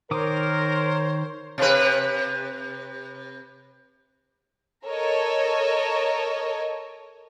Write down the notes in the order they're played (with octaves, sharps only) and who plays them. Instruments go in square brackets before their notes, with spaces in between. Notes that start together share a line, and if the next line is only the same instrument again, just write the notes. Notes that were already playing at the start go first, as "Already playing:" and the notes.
[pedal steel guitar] D#3 D6 D#6 [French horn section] A#4 [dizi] C5 [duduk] C#5
[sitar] C3 B4
[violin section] A4 A#4 C#5 D#5